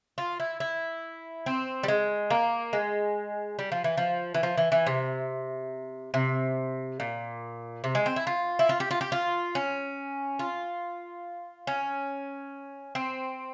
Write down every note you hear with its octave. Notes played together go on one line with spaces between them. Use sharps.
F4
E4
E4
C4
G3
G#3
A#3
G#3
G3
F3
E3
F3
E3
F3
E3
E3
C3
C3
A#2
C3
G#3
C4
E4
F4
E4
F4
G4
F4
G4
F4
C#4
F4
C#4
C4